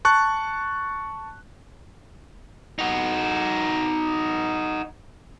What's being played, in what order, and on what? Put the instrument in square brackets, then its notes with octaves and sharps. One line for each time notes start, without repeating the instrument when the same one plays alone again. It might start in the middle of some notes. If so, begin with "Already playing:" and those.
[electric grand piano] A5 C#6 F#6
[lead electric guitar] D#4 F#4